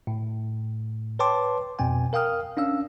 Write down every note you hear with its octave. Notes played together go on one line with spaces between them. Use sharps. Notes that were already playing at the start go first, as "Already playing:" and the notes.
A2
B4 C#5 G5 A5 C6 D6
F2 B2 C4 G5 G#5
A#4 F5 G5 D#6 F6
C#4 D4 F5 E6